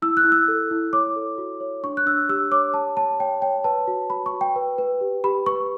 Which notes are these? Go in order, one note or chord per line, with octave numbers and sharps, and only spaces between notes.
E4 E6
F#6
E4
E6
A4
E4
C#5 D6
A4
F#4
C#5
D4 C#6
F#6
D4 E6
G4 E6
C#5 D6
C#5 A5
C#5 A5
C#5 G5
C#5 G5
B4 A5
F#4
F#4 B5
C#6
F#4
G5
B4
B4
G4
G4 B5
B4 C#6